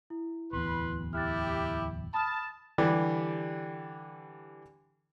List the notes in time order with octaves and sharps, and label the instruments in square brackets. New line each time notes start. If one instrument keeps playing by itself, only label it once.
[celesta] E4
[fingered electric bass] D1 E2 [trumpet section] B4 B5 C6
[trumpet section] E4 G4 [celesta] F6 F#6 A6
[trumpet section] A5 [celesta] B5 D#6 F6
[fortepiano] D3 E3 G3 D4 G4